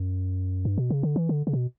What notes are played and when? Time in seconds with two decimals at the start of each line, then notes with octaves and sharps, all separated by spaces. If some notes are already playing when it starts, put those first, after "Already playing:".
Already playing: F#2
0.65 G2
0.78 B2
0.90 C#3
1.03 D3
1.16 E3
1.29 D3
1.47 C#3
1.53 B2